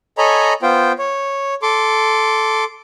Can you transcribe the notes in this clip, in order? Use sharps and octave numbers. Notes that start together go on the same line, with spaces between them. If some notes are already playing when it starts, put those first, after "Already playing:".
A4 C#5 D#5 G#5 A#5 B5
B3 F4 C5 G5
C#5
A4 C6 D6